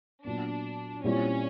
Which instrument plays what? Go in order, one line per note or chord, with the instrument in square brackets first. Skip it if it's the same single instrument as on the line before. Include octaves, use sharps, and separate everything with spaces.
[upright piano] A#2 F#3 B3 [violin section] D4
[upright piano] A#2 G3 C4 E4 G4 [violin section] C#4